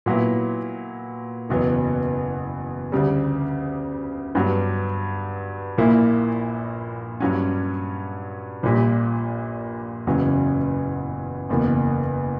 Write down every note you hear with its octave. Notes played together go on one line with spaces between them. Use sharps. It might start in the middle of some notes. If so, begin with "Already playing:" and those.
A#2 F#3 B3 E4
F#1 E2 B2 F#3 B3
D2 C#3 G3
G2 F#3 B3
A#1 A#2 A#3 E4
G2 F#3 C#4
A#1 A#2 G3
F#1 E2 C#3 F#3 C#4
F#1 E2 B2 A#3